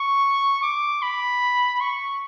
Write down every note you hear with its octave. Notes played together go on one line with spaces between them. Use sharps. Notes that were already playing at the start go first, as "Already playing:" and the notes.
Already playing: C#6
D6
B5
C#6